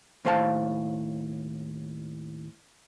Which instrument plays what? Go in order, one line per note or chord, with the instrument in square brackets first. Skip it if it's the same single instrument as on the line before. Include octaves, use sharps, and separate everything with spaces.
[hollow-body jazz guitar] D#2 A2 C5 F5 A5